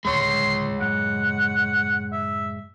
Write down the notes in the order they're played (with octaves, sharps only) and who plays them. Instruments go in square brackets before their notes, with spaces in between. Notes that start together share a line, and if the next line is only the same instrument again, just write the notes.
[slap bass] D1 C#2 G2 [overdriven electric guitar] G#3 C#5 [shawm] C6
[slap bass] F#2 A2 C#3 [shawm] F#5
[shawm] E5